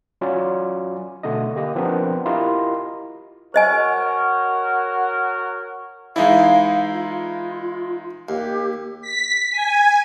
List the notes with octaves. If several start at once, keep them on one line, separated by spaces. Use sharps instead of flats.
F#3 C#4 F4 F#4 D5
B2 D3 A3 D4 D#5
A#3 G4 D#5
F3 B3 C4 D4 A#4
E4 F4 G4 A#4 D#5
F#4 A#4 C5 C#5 D#5 G#5
E3 G#3 D#4 E4 F5
F4
D#2 G4
B6
G#5